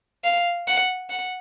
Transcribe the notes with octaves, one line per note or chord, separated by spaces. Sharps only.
F5
F#5
F#5